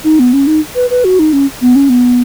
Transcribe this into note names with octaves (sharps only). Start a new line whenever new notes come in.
D#4
B3
C#4
D#4
B4
B4
F#4
D#4
C#4
B3
C#4
B3